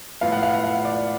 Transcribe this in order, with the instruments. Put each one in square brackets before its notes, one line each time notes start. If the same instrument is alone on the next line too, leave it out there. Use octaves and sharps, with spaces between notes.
[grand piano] A2 F3 B3 [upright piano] F5
[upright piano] F#5
F5
F#5
F5
D5